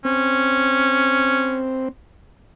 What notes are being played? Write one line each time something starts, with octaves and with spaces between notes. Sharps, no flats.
C4 C#4